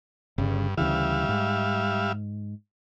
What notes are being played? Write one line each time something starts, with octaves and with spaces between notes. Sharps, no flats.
G1 G2 C#3
D2 C#3 E3 G3 E5 F5
G#2